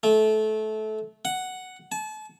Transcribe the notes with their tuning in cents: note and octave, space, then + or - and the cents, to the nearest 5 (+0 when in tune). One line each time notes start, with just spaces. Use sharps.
A3 -25
F#5 +0
A5 -35